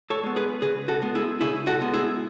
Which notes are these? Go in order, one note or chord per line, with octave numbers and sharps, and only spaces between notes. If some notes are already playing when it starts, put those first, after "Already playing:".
A4 C#5
G#3 B3
G#4 B4
C#3 G#4 B4
F#4 A4
G#3 B3
E4 G#4
C#3 E4 G#4
F#4 A4
G#3 B3
E4 G#4